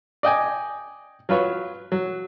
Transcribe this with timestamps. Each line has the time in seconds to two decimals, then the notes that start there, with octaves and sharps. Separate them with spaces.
0.23 D5 D#5 G5 G#5
1.29 F#3 F4 B4 C#5
1.92 F#3